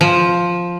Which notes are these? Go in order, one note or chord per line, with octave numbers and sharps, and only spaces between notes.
F3